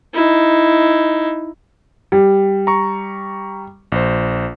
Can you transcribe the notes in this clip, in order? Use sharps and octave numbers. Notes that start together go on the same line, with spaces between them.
D#4 E4
G3
A#5 C#6
A#1 C5